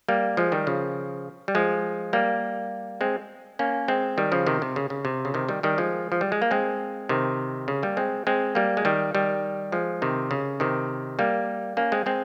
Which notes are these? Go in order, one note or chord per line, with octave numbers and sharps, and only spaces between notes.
G3 A#3
F3 G#3
D#3 G3
C#3 F3
G3
F3 G#3
G3 A#3
G#3 C4
A#3 C#4
G#3 C4
D#3 G3
C#3 F3
C3 D#3
C3
C#3
C#3
C3
C#3
C3 D#3
D#3 G3
D#3 G3
F3 G#3
F3
G3
G#3
A#3
G#3 C4
C3 D#3
C#3
G3 A#3
G#3 C4
G#3 C4
G3 A#3
G#3
D#3 G3
D#3 G3
F3 G#3
C3 D#3
C#3
C3 D#3
G3 A#3
A#3 C#4
G#3 C4
G#3 C4